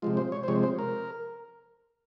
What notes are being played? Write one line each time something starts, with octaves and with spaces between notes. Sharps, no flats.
C3 F3 G#3 F4
C5
C#5
C5
C3 F3 G#3 C#5
C5
A#4